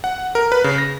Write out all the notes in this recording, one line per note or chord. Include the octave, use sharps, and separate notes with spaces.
F#5
A#4
B4
C#3
A#6